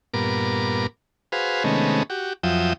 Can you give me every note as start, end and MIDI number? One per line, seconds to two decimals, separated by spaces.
0.14 0.87 43
0.14 0.87 46
0.14 0.87 59
0.14 0.87 70
0.14 0.87 86
1.32 1.64 66
1.32 1.64 68
1.32 1.64 71
1.32 1.64 72
1.32 1.64 77
1.64 2.03 48
1.64 2.03 51
1.64 2.03 56
1.64 2.03 57
1.64 2.03 59
1.64 2.03 61
2.10 2.33 66
2.10 2.33 67
2.43 2.73 41
2.43 2.73 53
2.43 2.73 54
2.43 2.73 76
2.43 2.73 79
2.43 2.73 87